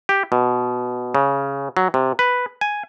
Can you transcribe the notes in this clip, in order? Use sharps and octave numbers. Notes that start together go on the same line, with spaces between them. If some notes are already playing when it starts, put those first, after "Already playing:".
G4
B2
C#3
F#3
C3
B4
G#5